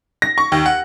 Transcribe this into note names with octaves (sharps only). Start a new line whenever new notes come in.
A#6
C#6
D#2
F#5